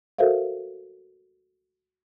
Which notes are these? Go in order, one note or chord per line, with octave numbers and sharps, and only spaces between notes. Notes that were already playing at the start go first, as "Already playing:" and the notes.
F#4 A4 A#4 C5 E5 F5